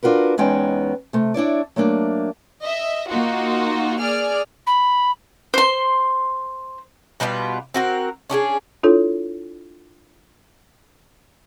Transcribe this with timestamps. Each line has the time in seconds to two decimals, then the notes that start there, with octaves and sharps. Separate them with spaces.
0.03 D4 F4 F#4 A#4 B4
0.38 E2 G#3 B3 C#4 D#4 G5
1.13 C3 A3
1.34 D4 E4 C#5 D5
1.76 F#3 A3 A#3 D4
2.63 D#5 E5
3.10 A#3 D#4 F4 F#4
4.00 G#4 D5 F6
4.66 B5
5.54 C5 C6
7.20 B2 G3 B3 F4
7.74 C4 F#4 A#4
8.30 C#4 D4 G4 G#4
8.83 D4 E4 F4 A4 C#5